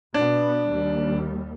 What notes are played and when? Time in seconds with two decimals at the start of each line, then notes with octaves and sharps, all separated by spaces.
0.14 B2 B3 D4
0.68 D#2 G3